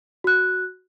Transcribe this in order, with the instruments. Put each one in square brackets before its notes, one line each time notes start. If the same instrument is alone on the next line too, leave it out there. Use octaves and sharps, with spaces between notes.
[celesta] F#4 F#6